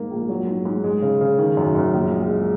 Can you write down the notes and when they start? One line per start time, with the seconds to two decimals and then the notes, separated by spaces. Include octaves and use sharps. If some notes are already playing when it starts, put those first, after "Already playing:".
Already playing: G#2 A#3
0.11 A#1
0.29 F#3
0.48 G#2
0.65 G#2
0.84 G#3
1.02 C#3
1.21 C#3
1.38 D#3
1.57 F#2
1.75 F#2
1.94 A#1
2.12 G#3
2.30 G#3